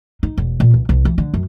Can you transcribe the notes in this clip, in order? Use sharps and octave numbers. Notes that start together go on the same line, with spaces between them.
D#4
E1
A#2
C#2
C2
E3
D3
F#2